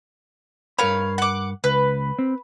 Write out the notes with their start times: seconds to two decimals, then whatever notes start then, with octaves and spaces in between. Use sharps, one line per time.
0.78 G2 A#4 C#5 F5 B5
1.18 F#5 D6
1.64 C#2 B4
2.19 C4